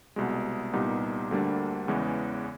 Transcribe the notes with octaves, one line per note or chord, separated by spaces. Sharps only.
C2 B2 G#3
C2 A#2 G3 B3 D#4
D2 D3 G3 A#3 D4
E2 C#3 E3 G#3